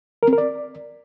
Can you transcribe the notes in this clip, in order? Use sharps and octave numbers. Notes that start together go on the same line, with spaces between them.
A#4
C4
A#4
D5